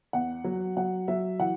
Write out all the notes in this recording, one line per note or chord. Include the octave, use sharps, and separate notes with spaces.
E2 F#5
F#3
F#3 F#5
F#3 E5
E3 F#5